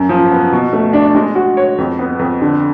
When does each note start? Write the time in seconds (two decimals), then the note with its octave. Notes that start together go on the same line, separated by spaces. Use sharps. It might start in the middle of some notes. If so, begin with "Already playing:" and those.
Already playing: F#2
0.09 F3
0.31 B3
0.52 B2
0.73 A3
0.93 D4
1.15 G#3
1.35 F#4
1.57 C#5
1.78 F2
1.99 B3
2.19 F2
2.41 D3